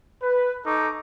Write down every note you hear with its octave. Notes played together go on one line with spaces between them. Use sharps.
B4
D#4 A4 C#6 D6